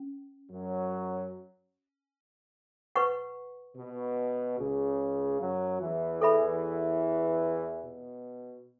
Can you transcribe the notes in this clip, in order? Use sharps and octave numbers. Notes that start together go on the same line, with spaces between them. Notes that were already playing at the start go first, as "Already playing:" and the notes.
Already playing: C#4
F#2 F#3
B4 F#5 C#6
B2
C#2 C#3
F#2 F#3
E2 E3
A4 E5 B5
B2